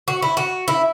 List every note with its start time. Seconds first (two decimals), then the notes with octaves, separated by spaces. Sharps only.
0.08 F#4
0.22 E4
0.37 F#4
0.68 E4